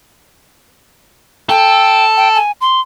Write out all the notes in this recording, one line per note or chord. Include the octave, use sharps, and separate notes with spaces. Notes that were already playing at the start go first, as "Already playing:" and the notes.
A4 G5
G5
G#5
C6